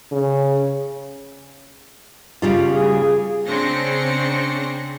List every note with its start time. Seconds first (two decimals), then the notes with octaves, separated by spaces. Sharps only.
0.12 C#3
2.42 C#3 G3 F4
2.72 G#4
3.47 C#3 C4 D4 C5 A#6 C#7